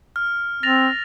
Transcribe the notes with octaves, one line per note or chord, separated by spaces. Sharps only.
F6
C4 A6 A#6 F7